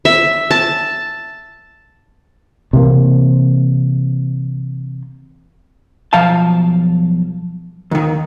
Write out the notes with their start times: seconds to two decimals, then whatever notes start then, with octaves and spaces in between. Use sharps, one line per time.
0.05 E5
0.51 A5
2.73 C3 E3 A#3
6.13 B1 F3 F5 A5
7.91 D#2 D#3